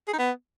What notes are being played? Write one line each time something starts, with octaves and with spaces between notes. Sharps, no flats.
G#4
D#4
B3